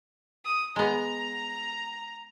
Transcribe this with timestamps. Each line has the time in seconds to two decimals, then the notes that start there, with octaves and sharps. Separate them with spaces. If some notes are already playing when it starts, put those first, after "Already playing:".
0.45 D#6
0.76 G#3 B3 A#5